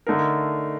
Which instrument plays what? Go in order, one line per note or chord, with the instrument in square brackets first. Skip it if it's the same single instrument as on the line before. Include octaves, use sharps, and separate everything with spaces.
[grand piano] D3 A3 D#4 A#4